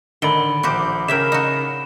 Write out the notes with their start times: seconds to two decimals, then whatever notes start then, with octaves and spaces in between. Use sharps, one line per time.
0.22 A2 D3 D#3 A4 B5 D7 G7
0.63 A#1 F#4 G4 C5 D6
1.08 C#3 E4 A#4 E5 G5 E7
1.32 D#4 F#4